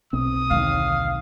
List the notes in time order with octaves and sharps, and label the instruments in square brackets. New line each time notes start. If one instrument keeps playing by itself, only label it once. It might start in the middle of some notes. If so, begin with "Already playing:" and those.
[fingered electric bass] B1 C4 [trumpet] D#6
[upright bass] D#2 D3 [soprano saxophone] F5